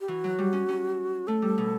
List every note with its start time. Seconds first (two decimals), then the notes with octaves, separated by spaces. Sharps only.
0.01 G4
0.08 E3 F#4
0.24 F#3
0.38 G3
0.53 C#4
0.69 C#4
1.27 A3 A4
1.42 G3
1.58 B2